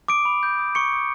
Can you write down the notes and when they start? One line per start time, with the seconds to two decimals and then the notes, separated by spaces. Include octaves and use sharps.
0.08 D6 D#6 D7
0.25 B5
0.43 G6
0.59 D#6
0.75 C#6 D#6 C#7
0.93 D#6